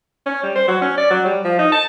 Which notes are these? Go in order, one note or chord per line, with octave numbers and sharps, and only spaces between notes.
C#4
G3
C5
F#3
C#4
D5
F#3
G3
F3
D#4
A5